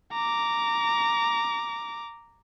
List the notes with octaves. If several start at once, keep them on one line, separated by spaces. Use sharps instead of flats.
A#5 D6